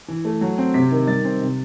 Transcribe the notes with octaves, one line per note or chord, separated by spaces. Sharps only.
E3
A3
F#3
C4
C3 B6
D#3
G3 A6
C4
C3